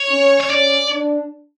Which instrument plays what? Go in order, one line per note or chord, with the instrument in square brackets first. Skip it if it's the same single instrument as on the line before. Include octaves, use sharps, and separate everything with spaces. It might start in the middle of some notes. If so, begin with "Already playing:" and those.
Already playing: [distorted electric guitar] C#5
[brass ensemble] C#4
[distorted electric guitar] C#5
[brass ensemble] C#4 [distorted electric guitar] D5
[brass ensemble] D4